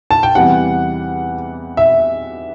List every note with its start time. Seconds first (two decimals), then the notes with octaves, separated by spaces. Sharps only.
0.11 A5
0.23 G5
0.35 E2 C3 E3 G3 F#5
1.77 E5